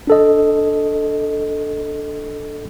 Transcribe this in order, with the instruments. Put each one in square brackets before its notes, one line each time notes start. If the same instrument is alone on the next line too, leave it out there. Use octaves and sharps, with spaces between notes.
[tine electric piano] D4 A4 D#5